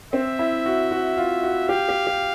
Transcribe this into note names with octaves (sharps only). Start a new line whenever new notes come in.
C4 E5
E4
F#4
F#4
F4
F#4
G4 F5
G4
G4